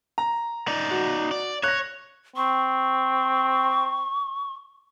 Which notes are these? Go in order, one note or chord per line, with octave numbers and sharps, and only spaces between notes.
A#5
D#4 D5
F#4
D5
C#5 F#6 A#6
C4 C#6